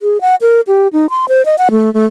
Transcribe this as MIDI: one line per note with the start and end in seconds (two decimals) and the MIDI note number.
0.01 0.21 68
0.21 0.35 78
0.42 0.61 70
0.67 0.88 67
0.93 1.07 63
1.10 1.25 84
1.29 1.44 72
1.46 1.56 75
1.58 1.69 78
1.71 1.93 57
1.94 2.06 57